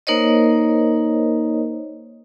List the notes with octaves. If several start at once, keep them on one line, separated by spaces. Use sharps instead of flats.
A#3 D#4 A#4 C5 C#5 D#5